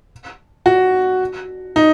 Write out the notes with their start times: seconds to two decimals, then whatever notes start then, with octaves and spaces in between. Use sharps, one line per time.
0.66 F#4
1.76 D#4